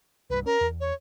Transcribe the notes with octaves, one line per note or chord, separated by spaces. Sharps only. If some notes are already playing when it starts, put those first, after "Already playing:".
C2 G2 B4
C#4 A#4
E2
C#5